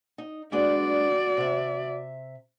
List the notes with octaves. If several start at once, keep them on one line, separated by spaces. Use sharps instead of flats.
D#4
G#3 B3 D4 F#4 D5
C3 E5